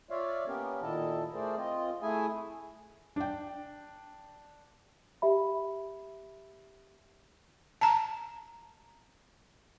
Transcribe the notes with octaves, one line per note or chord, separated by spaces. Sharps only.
F4 C#5 D5 E5 F5
A#3 B3 C#4 G4 A#4
A#2 D#3 E4 A4 D#5 A5
A3 G#4 A#4 C5 D5
C4 F4 D#5
A3 E4 G#4 E5 G#5
D4 G5
G4 E5 B5
A5 A#5